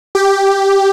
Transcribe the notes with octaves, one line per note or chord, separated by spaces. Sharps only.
G4